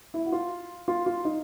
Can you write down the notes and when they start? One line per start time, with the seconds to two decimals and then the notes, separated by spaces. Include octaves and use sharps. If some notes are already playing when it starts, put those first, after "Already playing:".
0.14 E4
0.26 F#4
0.32 F4
0.88 F4
1.06 F4
1.25 D#4